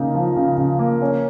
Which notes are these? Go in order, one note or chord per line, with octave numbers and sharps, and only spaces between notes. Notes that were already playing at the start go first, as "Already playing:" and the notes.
Already playing: C#3 A#3 D#4
F3
C#3
C#3
A#3
C#4